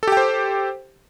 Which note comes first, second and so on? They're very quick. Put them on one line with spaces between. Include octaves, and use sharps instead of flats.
A4 G4 G5 C5